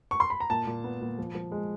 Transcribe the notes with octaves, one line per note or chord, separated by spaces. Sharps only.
C#6
C6
B5
A#5
A#2 A5
A#2
B3
A#2
F3
F3
G#3